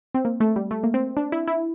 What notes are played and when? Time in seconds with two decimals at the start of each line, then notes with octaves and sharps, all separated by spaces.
0.14 C4
0.25 A#3
0.40 A3
0.56 G3
0.71 A3
0.84 A#3
0.94 C4
1.17 D4
1.32 E4
1.48 E4